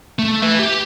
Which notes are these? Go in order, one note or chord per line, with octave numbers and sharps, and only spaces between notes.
A3
B4 E5
G4